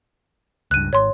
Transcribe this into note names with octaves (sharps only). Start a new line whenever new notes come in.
C#2 G2 F#6 D#7
G#1 C#5 C6